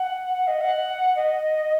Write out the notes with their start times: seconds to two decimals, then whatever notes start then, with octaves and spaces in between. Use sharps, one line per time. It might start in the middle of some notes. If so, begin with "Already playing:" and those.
Already playing: F#5
0.33 F#5
0.47 D#5
0.61 F#5
1.16 D#5